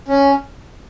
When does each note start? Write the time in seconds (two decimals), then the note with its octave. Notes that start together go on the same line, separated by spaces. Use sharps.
0.08 C#4